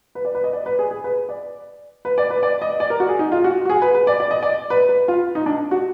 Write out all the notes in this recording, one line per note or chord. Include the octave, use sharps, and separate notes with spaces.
B4
D5
B4
D#5
D5
B4
G#4
G#4
B4
D5
B4
D5
B4
D5
D#5
D5
A#4
F#4
G#4
D#4
F4
F#4
F#4
G#4
B4
B4
D5
D5
D#5
D5
B4
B4
F4
D#4
D4
F#4